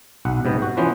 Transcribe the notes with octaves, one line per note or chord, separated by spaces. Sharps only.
B1 F#5
G#2 C3 B3
F#4
E3 F3 B3 C#4 C5